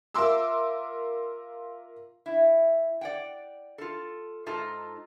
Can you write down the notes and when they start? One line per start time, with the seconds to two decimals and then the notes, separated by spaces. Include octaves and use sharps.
0.14 F4 A#4 E5 C6 D6 E6
2.26 E4
3.01 D5 F#5 G5
3.78 F4 A4
4.46 G#2 D#4 F4 A4 A5